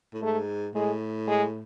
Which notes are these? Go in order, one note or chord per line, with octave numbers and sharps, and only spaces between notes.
A2
G#2 A3
A2 G#3
G#3